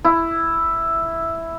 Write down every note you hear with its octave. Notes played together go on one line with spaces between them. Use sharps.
E4